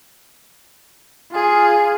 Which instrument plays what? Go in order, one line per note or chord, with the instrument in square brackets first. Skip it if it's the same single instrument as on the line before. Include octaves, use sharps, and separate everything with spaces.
[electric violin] F4 G#4